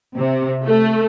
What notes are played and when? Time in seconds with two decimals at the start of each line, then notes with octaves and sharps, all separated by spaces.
0.16 C3
0.65 A3